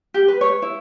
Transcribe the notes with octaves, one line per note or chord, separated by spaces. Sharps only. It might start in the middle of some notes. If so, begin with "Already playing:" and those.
G4
B4
C#5
E4